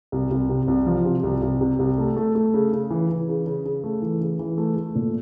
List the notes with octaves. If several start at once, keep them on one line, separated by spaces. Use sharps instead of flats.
C2
C2
C3
C2
F3
C3
C2
C2
C3
C2
A3
A3
A3
C#3
C#3
E3
E3
C#3
C#3
C#3
A3
E3
C#3
E3
A3
A3
A#2